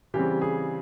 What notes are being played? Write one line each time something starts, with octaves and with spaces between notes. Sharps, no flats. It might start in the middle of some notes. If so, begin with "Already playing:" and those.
C#3 E3 G3 C4 G4
G#4